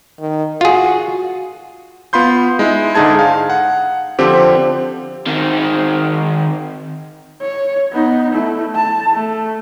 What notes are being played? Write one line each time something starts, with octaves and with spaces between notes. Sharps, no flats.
D#3
F4 F#4 G#4
B3 F4 B5 C6 G6
G#3 D#4 E4
G#2 D3 D#4 G#4 A5 G#6
F5
F#5
D3 F3 C4 G4
D#3 C4
C#5
B3 D#4
A3 E4
A5
A3